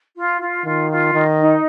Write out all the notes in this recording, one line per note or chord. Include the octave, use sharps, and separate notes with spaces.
F4
F4
D#3 F4
F4
D#3 D#5
D#4